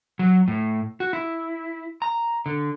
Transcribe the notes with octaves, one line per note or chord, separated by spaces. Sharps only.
F#3
A2
F#4
E4
A#5
D3